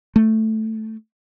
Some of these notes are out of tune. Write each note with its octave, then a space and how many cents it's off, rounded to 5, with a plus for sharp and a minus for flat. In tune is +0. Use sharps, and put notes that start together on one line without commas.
A3 +0